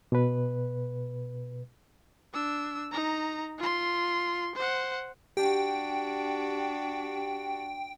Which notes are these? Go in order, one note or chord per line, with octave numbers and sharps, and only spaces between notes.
B2 B4
D4 E6
D#4 A#5
F4 C6
C5 F#5
D4 F#4 G4 G5